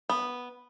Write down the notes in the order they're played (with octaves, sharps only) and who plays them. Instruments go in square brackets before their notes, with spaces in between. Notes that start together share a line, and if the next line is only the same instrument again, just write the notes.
[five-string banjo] B3